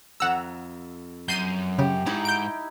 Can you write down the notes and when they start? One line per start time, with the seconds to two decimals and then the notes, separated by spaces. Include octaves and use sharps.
0.20 F2 F#5 A#5 E6
1.28 F#2 G6 C7 D#7
1.79 C#3 G4
2.06 G#2 D#4 E4
2.25 G6 D7